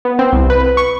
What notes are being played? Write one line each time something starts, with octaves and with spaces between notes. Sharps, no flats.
B3
C4
C2
B4
C#6